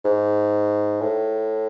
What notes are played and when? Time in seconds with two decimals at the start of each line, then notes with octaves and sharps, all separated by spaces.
0.05 G#2
1.02 A2